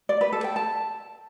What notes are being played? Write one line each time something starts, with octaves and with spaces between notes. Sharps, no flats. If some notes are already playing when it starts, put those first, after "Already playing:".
D5
B4
A4
G5
A5